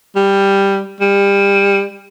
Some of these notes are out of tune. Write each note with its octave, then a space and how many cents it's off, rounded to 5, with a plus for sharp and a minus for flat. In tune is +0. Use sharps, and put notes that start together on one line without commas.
G3 +5
G3 +25